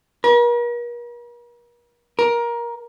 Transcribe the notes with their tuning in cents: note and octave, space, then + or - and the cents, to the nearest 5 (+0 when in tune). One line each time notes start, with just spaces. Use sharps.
A#4 +45
A#4 +20